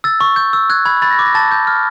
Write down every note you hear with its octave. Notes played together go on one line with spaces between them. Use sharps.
E6 A6
C#6
G6
E6
F#6 G#6
B5 G#6
B5 A6
A#6
D6
A#6
A5 A6
D6 G6
F6